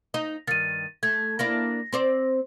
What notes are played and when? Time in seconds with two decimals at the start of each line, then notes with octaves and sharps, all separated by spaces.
0.14 D#4 D#5
0.47 G2 D#3 A6 D#7
1.03 A3 G#6
1.39 A#3 D4 E4 A#6
1.93 C4 C5 D5